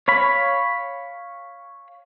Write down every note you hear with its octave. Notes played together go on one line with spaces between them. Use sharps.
C#5 F5 B5